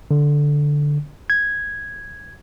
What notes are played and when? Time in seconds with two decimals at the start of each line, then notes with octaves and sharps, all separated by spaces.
0.11 D3
1.30 G#6